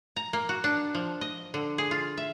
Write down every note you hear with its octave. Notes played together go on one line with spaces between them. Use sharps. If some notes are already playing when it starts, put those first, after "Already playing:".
A#5
A#3
F#4
D4
F3
D#5
D3
G#4
F4
E5